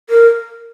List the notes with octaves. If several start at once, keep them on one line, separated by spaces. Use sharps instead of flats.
A#4